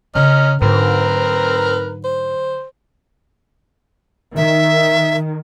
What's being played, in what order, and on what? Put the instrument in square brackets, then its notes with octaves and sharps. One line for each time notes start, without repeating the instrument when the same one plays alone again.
[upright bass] C#3 [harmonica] C#4 A#5 F6 [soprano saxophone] D#5
[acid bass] G#2 [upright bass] D3 F#3 [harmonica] C4 A#4 A#5 [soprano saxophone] B4
[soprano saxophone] C5
[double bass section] D#3 [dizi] E5